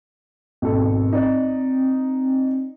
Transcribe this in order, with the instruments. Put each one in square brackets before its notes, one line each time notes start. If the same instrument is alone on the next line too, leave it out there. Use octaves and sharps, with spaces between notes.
[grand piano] G#1 B2 A4 [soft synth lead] C4
[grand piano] D#4 D5